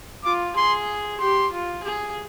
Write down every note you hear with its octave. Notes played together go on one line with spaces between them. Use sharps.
F4 D6
G#4 C6
G4 C6
F4
G#4